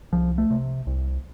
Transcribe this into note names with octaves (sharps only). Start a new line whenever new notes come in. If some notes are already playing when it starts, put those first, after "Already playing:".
C2 F3
A3
C3
C2